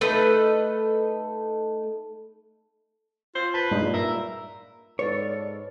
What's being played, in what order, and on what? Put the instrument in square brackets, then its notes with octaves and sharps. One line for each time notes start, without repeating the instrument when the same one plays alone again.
[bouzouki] A3 D#4 A4 B4
[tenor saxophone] F4 [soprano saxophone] C5
[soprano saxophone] B4 [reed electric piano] A5
[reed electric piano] G2 G#3 D#4 [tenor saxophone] A#2
[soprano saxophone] A#4 [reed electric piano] E5 E6
[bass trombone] G#2 [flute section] A4 D5 [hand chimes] B4 [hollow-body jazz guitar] C#5